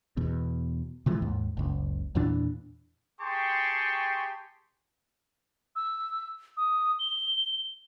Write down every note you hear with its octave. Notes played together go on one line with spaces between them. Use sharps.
E2 B2
C3 E3 F3 G#3
D#2 G#2
F#1 C#2
E2 A#2 E3 D4
G4 G#4 G5 A5 C6 C#6
E6
D#6
G7